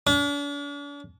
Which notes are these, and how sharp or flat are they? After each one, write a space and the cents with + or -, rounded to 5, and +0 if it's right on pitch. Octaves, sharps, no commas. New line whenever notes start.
D4 -40